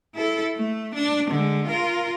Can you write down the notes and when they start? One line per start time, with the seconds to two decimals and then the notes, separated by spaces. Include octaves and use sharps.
0.15 E4 A4
0.56 A3
0.94 D4
1.30 D3 G#3
1.67 F4 A#4